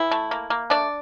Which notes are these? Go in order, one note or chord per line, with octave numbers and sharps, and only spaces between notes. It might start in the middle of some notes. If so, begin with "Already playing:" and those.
Already playing: E3 E4
A3
A#3
A#3
A3 D4 D5